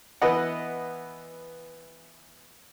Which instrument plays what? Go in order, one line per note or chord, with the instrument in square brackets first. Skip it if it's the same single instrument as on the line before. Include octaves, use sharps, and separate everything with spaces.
[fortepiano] E3 B3 B4 D#5 F#5